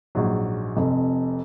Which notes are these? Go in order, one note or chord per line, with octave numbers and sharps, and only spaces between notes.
A#1 G#2 F#3
F1 F2 C3